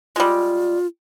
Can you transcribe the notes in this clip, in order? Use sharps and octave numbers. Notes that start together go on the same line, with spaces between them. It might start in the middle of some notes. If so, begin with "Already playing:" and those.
G3 G#3 F4